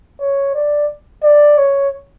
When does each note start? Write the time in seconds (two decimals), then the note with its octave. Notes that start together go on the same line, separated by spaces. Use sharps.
0.20 C#5
0.55 D5
1.23 D5
1.58 C#5